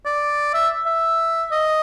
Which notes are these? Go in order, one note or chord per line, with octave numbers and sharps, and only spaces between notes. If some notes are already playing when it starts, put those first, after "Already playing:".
D5
E5
E5
D#5